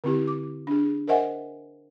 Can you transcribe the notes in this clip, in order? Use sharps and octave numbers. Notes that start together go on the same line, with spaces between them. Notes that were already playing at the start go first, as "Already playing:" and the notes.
D3 C4 E4 G4
D6
D4 G#4
A#4 C5 D#5 E5 F#5 G#5